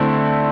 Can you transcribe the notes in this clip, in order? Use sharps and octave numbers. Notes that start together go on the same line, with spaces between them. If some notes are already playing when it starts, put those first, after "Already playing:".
Already playing: D3 A3 C4 E4